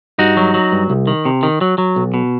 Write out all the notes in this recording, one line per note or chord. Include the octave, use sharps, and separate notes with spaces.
G2 D#4 F#4
F#3
F#3
G2
C2
D#3
C3
D#3
F#3
F#3
B1
B2